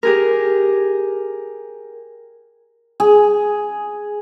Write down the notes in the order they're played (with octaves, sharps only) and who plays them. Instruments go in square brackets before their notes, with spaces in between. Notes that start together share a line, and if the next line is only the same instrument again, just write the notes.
[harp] G4 G#4 A#4
[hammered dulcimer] G#4